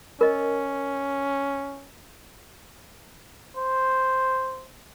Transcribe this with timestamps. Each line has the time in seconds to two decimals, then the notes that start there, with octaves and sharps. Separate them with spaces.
0.21 C#4 A#4 D#5
3.57 C5